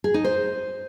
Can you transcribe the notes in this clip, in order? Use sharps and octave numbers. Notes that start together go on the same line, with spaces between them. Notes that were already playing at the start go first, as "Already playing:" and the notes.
G#4
D#4
C5